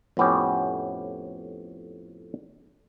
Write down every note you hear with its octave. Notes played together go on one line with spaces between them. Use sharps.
F2 A2 B3 C#4 G4